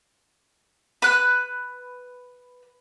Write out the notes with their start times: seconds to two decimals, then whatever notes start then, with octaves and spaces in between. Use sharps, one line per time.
1.02 B4 F#6